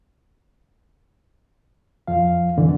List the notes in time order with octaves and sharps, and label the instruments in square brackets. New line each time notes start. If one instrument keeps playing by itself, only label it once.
[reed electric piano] F2 F3 F5
F2 D3 E3